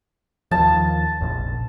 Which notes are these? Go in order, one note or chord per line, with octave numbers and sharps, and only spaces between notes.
D#2 F3 A5
F1 A#1